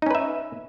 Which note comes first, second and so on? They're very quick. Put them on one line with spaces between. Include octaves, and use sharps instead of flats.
D#4 C#4 B4 E5